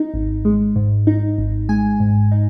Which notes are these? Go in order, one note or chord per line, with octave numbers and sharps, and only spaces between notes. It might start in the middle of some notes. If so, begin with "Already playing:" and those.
Already playing: D#4
G#1
G#3
G#2
D#4
G#1
G#3 G#5
G#2
D#4